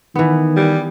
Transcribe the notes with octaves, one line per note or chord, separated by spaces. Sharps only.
D#3 E3 B3
G3